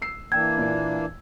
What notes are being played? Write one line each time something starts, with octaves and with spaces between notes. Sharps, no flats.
E6 C7
E3 A#3 D4 G5 E6 G#6
A#2 D5